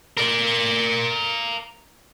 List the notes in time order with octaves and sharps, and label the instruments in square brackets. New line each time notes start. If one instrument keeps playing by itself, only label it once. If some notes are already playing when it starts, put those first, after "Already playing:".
[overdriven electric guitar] A#4 D5